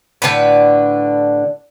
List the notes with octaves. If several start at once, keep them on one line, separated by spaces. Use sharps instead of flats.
A2 D3 D4 B4